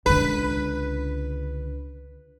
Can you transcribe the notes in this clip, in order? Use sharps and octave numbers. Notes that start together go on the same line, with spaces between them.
C#2 D3 B4